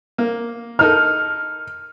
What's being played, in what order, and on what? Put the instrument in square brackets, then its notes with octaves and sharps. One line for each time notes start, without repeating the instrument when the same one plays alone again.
[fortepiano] A#3
[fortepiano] D#4 A4 A#4 [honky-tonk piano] F6